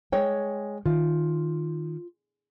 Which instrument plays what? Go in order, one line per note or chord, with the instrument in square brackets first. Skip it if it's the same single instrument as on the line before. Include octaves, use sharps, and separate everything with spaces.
[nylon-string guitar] G#3 C#5 G5
[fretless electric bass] D#3 [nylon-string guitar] F4